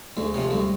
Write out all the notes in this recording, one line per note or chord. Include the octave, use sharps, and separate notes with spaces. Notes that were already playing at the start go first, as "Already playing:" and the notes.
D2 G#3
C3 F3
D2 G3